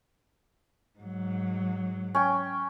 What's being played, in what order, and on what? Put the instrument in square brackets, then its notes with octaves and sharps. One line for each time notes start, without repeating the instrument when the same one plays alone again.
[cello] G#2 F#3
[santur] C#4 G5